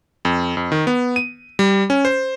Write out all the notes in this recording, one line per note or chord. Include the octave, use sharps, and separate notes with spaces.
F2
F2
D#3
B3
D#7
G3
C#4
C5